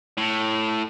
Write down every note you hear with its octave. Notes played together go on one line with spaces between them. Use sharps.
A2